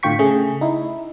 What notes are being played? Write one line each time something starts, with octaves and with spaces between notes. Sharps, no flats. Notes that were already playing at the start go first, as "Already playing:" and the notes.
A2 D3 F4 G5 C#6 B6
C#3 A3 G#4
D#4 E4